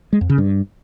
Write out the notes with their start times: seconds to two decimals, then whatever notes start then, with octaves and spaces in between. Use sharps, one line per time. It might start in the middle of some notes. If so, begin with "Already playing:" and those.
0.13 G#3
0.21 F2
0.29 C#3
0.38 G2